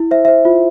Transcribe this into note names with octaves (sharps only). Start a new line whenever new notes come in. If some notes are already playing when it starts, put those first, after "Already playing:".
Already playing: E4
C5 E5
C5 E5
F4